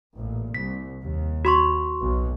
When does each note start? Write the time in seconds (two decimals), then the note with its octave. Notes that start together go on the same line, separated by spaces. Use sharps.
0.15 A1 A#2
0.54 C2 B6
1.02 D#2
1.45 F#4 C6 C#6
2.01 B1 B2